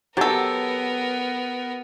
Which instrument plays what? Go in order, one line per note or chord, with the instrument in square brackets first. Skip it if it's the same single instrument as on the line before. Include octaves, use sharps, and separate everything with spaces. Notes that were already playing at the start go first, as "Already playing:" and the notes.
[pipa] F#3 A4 [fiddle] B3 A#4 [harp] G4 A6